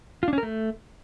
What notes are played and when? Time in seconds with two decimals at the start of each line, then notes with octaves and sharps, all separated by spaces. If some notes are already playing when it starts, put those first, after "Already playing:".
0.23 F4
0.28 D4
0.33 C#4
0.38 A#4
0.43 A3